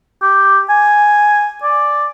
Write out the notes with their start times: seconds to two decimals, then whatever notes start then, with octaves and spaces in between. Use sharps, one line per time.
0.22 G4
0.69 G#5
1.63 D5